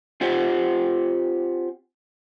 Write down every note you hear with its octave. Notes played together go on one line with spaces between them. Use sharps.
C4 F4 G4 C5 F#5 G#5